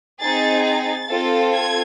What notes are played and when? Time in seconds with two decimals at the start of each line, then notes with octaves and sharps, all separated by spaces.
0.20 C4 D#4 G#4 A6
0.64 A6
1.08 C4 F4 A4
1.52 G#6